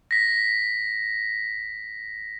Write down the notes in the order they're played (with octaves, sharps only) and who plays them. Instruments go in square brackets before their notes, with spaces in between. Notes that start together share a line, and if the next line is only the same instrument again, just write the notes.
[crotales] A#6 B6